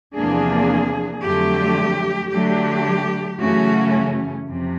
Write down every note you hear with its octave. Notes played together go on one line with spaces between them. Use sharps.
E2 C3 F3 A#3 D4 G#4
F2 D3 F#3 A3 G4
D3 F#3 A3 D4 G4
F#2 C#3 E3 A3 C#4 F#4
F2 C3